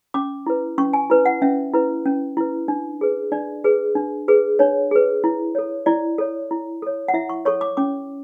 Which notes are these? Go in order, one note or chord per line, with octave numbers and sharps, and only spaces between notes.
C#4 D6
E4 B4
C#4 C#6
G#5
E4 B4
F#5
C#4 E5
E4 B4
C#4
E4 B4
D4
G#4 B4
D4 D5
G#4 B4
D4
G#4 B4
D4 C#5
G#4 B4
E4
A4 C#5
E4 D5
A4 C#5
E4
A4 C#5
F#5
E4 E5
C#6
A4 C#5 C#6
D6
C#4 D6